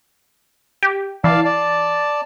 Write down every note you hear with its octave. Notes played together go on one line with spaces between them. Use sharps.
G4
E3 D5 F5 A5
D5 A5